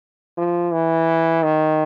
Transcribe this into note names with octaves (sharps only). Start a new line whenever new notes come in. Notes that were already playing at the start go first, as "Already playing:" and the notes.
F3
E3
D#3